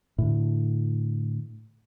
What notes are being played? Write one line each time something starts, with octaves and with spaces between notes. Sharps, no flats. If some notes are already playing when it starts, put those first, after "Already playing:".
A2 D3